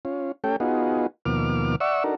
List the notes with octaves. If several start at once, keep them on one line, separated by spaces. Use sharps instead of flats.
C#4 F4
A3 C#4 G4 A4 G5
B3 D#4 F4 F#4 G#4
D#2 B2 F3 A#3 D6 F6
D5 E5 F#5 C#6 E6
D4 D#4 F#4 A4 A#4